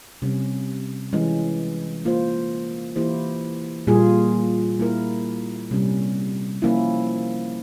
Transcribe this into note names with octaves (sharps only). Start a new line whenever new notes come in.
C3 G3 C#4
E3 G#3 C#4
A#3 F4 C5
E3 A#3 E4 G4 C5
A#2 G3 A#3 F4 G#4
A#3 E4 A#4
C3 G3 C#4
F3 A#3 C#4 E4